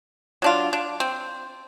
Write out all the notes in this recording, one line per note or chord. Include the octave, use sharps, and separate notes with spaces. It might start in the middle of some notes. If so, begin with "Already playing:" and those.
F#3 D4 F4
D4
C4